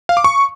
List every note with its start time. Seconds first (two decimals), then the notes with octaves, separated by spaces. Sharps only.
0.09 F5
0.17 D6
0.24 C#6